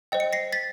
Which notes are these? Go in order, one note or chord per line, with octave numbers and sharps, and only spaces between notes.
C5 D#5 G5
C#7
A#6 C7
A6 B6